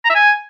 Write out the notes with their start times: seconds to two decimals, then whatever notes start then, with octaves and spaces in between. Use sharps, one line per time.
0.05 A#5
0.10 E5
0.15 G#5